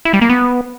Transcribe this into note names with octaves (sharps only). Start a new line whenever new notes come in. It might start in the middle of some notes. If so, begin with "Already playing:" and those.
E4
G3
A#3
B3